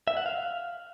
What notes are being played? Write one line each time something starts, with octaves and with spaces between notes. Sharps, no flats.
E5
F#5
F5